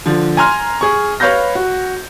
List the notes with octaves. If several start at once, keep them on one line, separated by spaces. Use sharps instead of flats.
D3 F3
G#5 A#5 C6 F6
G#4 C#6
B4 C#5 F5 B5 G6 A#6
F#4